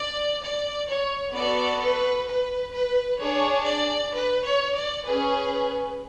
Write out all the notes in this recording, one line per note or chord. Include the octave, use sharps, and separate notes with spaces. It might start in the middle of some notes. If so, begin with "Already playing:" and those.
Already playing: D5
D5
C#5
B3 F#4 A4 D5
B4
B4
B4
D4 G#4 C#5
D5
B4
C#5
D5
C#4 G#4 B4